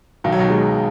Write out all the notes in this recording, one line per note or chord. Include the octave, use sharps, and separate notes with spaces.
B1 D#3
F#3
B2 D#3
G#3